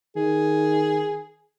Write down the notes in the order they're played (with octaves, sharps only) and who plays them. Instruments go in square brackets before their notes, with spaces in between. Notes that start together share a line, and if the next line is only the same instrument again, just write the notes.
[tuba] D#3 [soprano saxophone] G#4